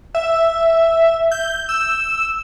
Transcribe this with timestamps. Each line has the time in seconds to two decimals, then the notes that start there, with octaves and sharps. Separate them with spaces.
0.15 E5
1.31 G6
1.69 E6